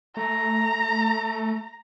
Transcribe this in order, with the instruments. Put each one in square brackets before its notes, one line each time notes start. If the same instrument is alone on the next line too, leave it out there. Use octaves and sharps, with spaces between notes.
[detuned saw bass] A3 [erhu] A#5